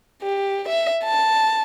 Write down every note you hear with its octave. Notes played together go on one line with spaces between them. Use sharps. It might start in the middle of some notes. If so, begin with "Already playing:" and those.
G4
E5
A5